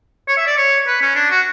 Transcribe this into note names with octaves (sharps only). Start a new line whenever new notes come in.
C#5
E5
D5
C#5
B4
C#4
D4
F#4